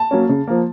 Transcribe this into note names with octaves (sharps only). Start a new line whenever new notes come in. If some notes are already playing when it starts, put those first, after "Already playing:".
Already playing: A5
F#3 A#3 C#4
C#3
F3 A#3